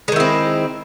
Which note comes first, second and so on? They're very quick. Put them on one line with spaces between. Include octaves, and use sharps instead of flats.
G#3 D#3 E4 C4